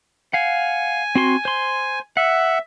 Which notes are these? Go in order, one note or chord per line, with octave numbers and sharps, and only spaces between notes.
F5 F#5 G#5
C4 F#4 C6
C5 C6
E5 F#5